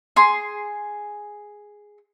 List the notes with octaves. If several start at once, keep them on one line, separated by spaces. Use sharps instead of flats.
G#4 C6